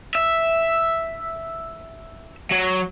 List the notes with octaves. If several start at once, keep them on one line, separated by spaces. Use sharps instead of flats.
E5
F#3